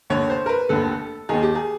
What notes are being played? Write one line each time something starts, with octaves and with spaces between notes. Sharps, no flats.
F1 D#2 D3 C#5
C5
A#4
B4
F1 D#2 D3 A4
D#2 D#3 G#4
G4
G#4